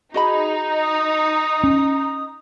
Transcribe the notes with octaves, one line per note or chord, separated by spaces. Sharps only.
D#4 F#4 G#4 D#5 B5
D#6
C#4